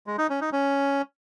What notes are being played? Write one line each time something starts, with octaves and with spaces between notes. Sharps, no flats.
G#3
D#4
C#4
D#4
C#4